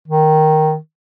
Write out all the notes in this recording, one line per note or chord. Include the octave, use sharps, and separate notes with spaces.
D#3